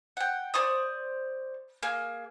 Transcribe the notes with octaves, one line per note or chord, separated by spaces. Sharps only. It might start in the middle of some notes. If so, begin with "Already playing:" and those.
F#5 G5
C5 D5 C#6 D#6
A#3 G#4